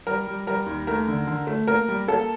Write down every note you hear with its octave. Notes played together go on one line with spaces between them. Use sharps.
G3 A#4
G3
G3 A#4
D#2
A3 A#4
D3
D3
A3
A#3 A#4
G3
A#3 A4